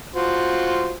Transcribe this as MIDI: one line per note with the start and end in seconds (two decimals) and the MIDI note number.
0.16 0.93 65
0.16 0.93 66
0.16 0.93 72